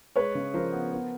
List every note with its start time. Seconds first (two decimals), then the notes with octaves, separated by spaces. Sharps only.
0.16 G#3 B4 C#5
0.35 C#3
0.54 F3 A#4 C5
0.72 B3
0.92 B3